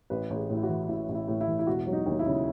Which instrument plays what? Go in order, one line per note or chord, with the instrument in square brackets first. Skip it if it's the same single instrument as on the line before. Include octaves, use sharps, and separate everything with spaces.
[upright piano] A1 B4
A1
G#4
A2 E4
F#4
E3
A1 E4
A1
E4
A2
E4
E3
E4
E1 F#4
F#3
D#4
D#2
E4
C#3